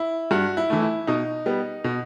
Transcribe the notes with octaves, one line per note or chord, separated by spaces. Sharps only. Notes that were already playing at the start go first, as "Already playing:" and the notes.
Already playing: E4
G2 F#4
E4
E3 A3
E4
B2 D#4
G3 B3
B2